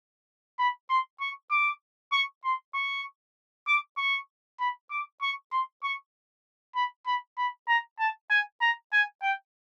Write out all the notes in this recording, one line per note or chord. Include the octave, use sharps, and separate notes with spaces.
B5
C6
C#6
D6
C#6
C6
C#6
D6
C#6
B5
D6
C#6
C6
C#6
B5
B5
B5
A#5
A5
G#5
A#5
G#5
G5